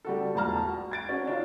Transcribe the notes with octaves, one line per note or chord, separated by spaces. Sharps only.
G3 F#4 A4
E1 A#1 A5 A#5 F6
F#4
G#6 A6 D7
C#4 F#4
D4 D#4 F4